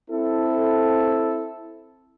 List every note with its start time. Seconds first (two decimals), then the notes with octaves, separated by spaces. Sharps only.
0.11 C4 E4 A4